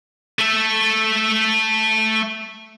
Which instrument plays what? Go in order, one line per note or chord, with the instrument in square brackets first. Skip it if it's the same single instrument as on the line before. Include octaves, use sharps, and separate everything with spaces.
[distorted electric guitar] A3 A4